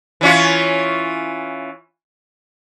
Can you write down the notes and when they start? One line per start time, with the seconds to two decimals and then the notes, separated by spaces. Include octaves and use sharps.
0.21 E3 C#4 F4